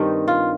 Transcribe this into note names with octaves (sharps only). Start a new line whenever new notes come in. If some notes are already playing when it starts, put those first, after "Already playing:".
Already playing: G2 D#3 G3 C4 D#4
F4